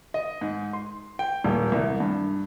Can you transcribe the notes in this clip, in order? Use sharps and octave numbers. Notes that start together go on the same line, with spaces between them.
D#5
G#2
C6
G5
D#1
C2
G2